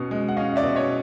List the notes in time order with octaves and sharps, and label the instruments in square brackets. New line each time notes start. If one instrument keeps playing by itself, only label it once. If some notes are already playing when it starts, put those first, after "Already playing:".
Already playing: [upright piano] B2 C#4
G#3
F#5
C#4 D#5 F5
D5 E5
B2
C#5 D#5